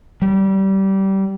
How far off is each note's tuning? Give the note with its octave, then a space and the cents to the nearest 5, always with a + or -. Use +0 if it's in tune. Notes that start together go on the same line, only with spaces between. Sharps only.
G3 -20